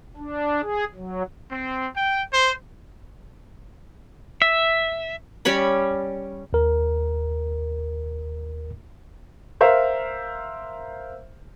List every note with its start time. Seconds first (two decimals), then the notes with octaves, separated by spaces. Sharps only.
0.17 D4
0.62 G#4
0.95 F#3
1.51 C4
1.96 G5
2.33 C5
4.42 E5
5.45 G3 C#4 C#5 B5
6.53 D#2 A#4
9.61 A#4 C5 E5 F5